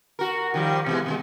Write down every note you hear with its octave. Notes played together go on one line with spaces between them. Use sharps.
F#4 A#4
D#3 F3 G3
B2 E3 G#3
B2 D3 G#3